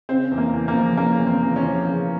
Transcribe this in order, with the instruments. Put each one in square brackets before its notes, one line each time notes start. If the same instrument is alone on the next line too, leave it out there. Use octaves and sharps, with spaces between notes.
[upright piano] C#3 C4
E2
A#3
E2
A#3
F3
C#3 A#3
E2
C4
E2
C#4
F3
C#3